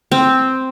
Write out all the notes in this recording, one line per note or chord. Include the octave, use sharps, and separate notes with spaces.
C4